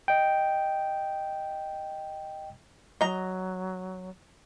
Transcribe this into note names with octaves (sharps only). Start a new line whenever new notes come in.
D#5 G5
F#3 D#5 A#5